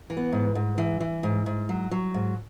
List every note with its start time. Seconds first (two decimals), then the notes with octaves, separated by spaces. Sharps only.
0.10 E3
0.17 B3
0.32 G#2
0.55 G#2
0.78 E3
1.00 E3
1.23 G#2
1.46 G#2
1.69 F#3
1.91 F#3
2.14 G#2